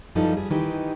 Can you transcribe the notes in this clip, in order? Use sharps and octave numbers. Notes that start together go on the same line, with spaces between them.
F#2 E3 F3 G3 D#4 A4
G3 G#4
D#3 E3 D#4 G4